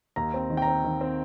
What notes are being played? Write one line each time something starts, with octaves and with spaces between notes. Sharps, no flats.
D#2 A#5
C4
D#3
G5
A#5
C4
D#3
C4